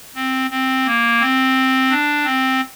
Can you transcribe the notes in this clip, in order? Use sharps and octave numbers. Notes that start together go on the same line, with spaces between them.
C4
C4
A#3
C4
D4
C4